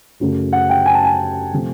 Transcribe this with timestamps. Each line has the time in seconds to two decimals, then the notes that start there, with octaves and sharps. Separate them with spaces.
0.20 F#2 C#3 F#3 A3
0.53 F#5
0.70 G5
0.86 G#5
0.94 A5
1.04 G#5
1.53 C3 F3 A3